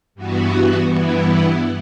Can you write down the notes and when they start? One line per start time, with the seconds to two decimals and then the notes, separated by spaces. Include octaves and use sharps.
0.15 G2 E3 B3 F#4
0.89 G2 E3 B3 E4